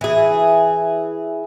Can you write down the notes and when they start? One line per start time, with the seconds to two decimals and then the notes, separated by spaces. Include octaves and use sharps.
0.01 E3 G#4